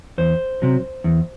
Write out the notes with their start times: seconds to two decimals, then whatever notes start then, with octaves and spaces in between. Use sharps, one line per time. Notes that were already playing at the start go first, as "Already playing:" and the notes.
0.18 E2 C5
0.62 C3 F#3
1.04 E2